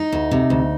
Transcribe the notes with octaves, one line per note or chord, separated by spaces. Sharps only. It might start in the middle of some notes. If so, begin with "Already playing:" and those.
Already playing: D#4
D2
C3
D2